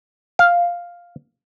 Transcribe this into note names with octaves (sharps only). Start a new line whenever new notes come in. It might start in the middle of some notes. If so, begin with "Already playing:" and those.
F5